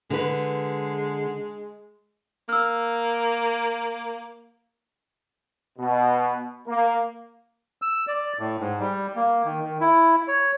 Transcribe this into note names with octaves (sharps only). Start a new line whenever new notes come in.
D3 G#3 B4
A#3 E6 F6
B2
A#3
E6
D5
A2
G#2
G3
A#3
D#3
D#3
E4
C#5